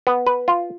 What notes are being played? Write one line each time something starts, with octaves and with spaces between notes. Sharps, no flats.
B3
B4
F4